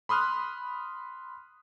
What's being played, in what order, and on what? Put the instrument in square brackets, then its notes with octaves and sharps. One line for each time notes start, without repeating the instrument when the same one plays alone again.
[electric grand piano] B5 C6 D#6 F6 F#6